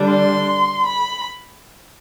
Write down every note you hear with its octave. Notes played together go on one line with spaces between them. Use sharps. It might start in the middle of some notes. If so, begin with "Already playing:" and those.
Already playing: D3 G3 D4
C6
B5